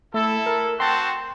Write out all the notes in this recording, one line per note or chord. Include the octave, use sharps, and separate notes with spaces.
A3 E4 A4
A#4
C4 F#4 G5 A5 C6